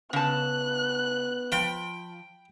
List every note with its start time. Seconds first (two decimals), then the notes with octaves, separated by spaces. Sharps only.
0.13 C#3 B3 A5 F#6
1.52 F3 G5 B5